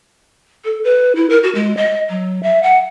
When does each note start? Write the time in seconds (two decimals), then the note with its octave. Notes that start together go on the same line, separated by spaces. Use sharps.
0.64 A4
0.84 B4
1.15 E4
1.29 A#4
1.43 F#4
1.55 G#3
1.77 D#5
2.09 F#3
2.43 E5
2.63 F#5